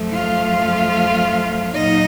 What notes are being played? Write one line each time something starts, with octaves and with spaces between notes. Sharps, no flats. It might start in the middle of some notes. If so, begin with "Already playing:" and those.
Already playing: F#2 F3 A3
F4 F5
A#2 F#3 D#4 D#5